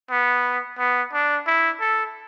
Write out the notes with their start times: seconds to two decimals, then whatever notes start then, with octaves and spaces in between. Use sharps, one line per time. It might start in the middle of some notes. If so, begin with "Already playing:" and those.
0.11 B3
0.78 B3
1.13 D4
1.47 E4
1.81 A4